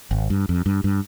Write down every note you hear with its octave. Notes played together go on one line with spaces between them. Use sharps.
G#1
G2
F2
G2
G2